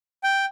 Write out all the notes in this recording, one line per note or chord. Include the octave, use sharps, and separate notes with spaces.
G5